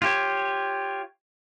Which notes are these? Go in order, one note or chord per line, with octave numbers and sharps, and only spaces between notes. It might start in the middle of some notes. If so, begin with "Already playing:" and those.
F4 G4 C#5